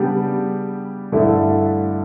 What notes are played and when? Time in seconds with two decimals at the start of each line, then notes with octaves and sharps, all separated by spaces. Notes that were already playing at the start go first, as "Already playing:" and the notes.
Already playing: C#3 G3 B3 D4 G4
1.12 G2 D3 A3 E4